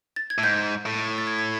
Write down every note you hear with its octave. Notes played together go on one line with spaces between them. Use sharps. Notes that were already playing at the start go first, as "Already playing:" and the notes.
A6
G#6
A2
G#2 G6
A2
A6
G#6
G#6